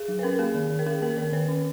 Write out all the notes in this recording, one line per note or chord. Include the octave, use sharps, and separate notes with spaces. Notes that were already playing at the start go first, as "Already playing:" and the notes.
Already playing: G#4
F#3
B4
C#4 A#4
A#3 G#4
D#3
D#3
A#4
C#4 G#4
A#3 A#4
D#3 A#4
D#3 B4
C#4